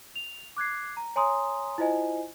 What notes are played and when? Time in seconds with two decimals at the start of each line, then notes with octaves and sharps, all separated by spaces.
0.16 F7
0.57 D6 F#6 G#6 C7
0.97 A#5
1.16 C#5 G#5 A#5 C6 D#6
1.78 E4 F4 C5 D#5 G#5